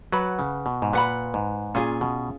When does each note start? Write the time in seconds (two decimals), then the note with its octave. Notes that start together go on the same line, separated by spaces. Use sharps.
0.12 F#3 B4 F#5 B5
0.39 C#3
0.66 B2
0.82 G#2
0.93 A#2 B4 F#5 B5
1.34 G#2
1.75 A#2 C#4 F4 G#4
2.01 B2